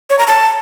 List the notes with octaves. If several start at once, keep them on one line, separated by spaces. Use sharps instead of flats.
C#5
A#5
A5